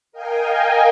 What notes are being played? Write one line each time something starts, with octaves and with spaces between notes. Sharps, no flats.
A#4 D#5 F5 G5 G#5